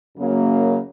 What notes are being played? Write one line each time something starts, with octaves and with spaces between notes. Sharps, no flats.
F#2 C#3 F#3 A#3